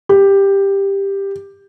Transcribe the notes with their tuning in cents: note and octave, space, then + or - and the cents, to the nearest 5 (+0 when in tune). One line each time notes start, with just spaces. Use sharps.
G4 +10